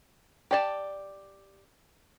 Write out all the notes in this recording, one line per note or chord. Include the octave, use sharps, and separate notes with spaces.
G4 D5 A5